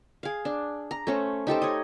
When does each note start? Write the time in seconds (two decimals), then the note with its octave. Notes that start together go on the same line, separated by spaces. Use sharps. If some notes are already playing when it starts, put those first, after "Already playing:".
0.23 G#4 F5
0.45 D4
0.91 A#5
1.07 A3 C#4 C5
1.47 D#4 G4 A4 C5
1.62 C#5 D#5